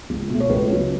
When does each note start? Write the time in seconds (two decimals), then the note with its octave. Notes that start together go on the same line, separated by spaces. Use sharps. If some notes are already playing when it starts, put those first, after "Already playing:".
0.10 C#2
0.30 B2 A3
0.40 C#5
0.50 C#2 B4
0.71 C#3 F#3 B3